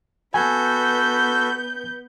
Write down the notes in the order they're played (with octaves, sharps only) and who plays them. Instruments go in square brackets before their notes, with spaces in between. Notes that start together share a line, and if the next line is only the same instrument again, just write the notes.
[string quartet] B3 B4 G6 [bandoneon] F#4 A4 B5 [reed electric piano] G#5